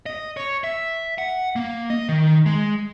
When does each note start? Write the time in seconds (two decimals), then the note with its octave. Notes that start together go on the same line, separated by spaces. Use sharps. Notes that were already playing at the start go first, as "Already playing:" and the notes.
0.06 D#5
0.37 C#5
0.64 E5
1.18 F#5
1.56 A#3
1.90 D#5
2.09 D#3
2.46 G#3